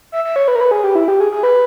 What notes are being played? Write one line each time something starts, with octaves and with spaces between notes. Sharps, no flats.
E5
E5
C#5
B4
A#4
B4
G#4
G4
E4
G4
G#4
G#4
B4